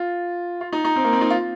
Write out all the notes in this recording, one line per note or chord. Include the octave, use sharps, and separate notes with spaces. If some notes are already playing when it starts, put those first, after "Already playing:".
Already playing: F4
F4
D#4
D#4
C4
A#3
C4
D#4
F4